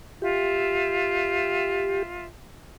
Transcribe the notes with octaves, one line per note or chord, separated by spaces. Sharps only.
F4 G4 E5